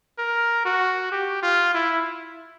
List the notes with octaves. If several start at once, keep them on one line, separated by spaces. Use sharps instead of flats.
A#4
F#4
G4
F4
E4